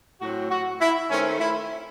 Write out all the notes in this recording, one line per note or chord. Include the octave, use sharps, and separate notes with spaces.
A2 F#3 C4 F#4
F#4
E4
D#3 A3 C4 C#4
E4